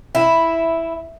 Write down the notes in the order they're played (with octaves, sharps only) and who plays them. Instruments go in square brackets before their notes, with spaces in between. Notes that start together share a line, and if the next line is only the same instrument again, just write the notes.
[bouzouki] E4